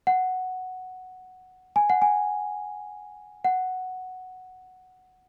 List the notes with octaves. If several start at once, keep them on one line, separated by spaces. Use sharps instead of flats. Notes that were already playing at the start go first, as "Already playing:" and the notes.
F#5
G#5
F#5
G#5
F#5